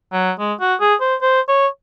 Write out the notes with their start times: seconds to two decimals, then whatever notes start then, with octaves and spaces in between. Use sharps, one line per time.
0.13 F#3
0.39 G#3
0.60 F#4
0.80 G#4
1.01 C5
1.22 C5
1.48 C#5